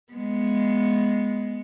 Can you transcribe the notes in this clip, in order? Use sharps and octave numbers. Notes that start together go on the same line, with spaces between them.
G#3 B3